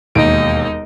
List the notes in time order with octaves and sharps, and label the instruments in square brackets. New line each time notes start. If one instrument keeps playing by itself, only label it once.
[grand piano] E1 D#2 D7 [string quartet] D#4